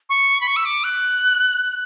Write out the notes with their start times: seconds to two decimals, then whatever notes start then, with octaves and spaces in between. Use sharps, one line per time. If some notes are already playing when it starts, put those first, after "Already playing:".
0.09 C#6
0.41 B5
0.48 C#6
0.56 E6
0.65 D6
0.84 F#6